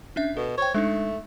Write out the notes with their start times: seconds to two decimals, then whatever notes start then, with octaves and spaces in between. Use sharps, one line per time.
0.16 C#4 D4 E5
0.37 B2 A4
0.58 C5 C#5 G5
0.74 G#3 A3 D4 D#4